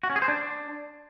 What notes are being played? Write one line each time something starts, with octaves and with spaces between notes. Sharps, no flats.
F#4
C#4
G#4
C5
D4